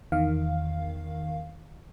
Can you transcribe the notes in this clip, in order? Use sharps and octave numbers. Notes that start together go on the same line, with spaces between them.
E2 D#3 F5